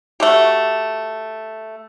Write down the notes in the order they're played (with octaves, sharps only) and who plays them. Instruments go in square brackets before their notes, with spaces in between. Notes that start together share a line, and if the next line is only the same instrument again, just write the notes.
[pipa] A3 F#4 G4